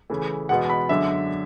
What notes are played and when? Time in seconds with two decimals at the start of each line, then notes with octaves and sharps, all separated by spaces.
0.10 C#3 E3 A3
0.49 E2 B2 G#3 B3 F#5
0.70 B5
0.89 F#2 D3 G#3 D4 E5